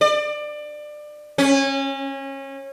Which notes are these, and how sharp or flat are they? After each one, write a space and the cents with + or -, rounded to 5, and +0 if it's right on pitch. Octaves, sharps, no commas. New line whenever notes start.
D5 +25
C#4 -25